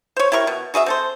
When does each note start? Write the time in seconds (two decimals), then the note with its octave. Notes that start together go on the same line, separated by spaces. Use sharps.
0.17 C5 C#5
0.32 E4 G4 A#4 C#6
0.47 B2
0.74 F#4 G#4 D#5 E5
0.86 C4 A4 C5